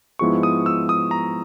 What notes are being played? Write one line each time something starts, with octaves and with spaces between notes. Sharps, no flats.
G#2 F3 G#3 B3 E4 C#6
D#6
E6
D#6
A#5